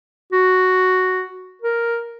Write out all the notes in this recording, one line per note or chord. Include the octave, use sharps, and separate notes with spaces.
F#4
A#4